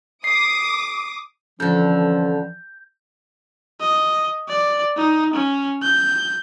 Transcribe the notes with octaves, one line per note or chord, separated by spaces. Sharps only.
D6 D#6 C7
F2 D3 E3 F3 C#4 G6
D#5
D5
D#4
C#4
G6